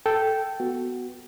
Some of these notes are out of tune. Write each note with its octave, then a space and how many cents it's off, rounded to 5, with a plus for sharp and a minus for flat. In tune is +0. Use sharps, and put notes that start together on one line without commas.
A4 +0 G5 -10
B3 +0 F#4 +0